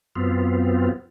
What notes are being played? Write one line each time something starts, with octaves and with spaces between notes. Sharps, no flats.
F#2 B3 C4 F4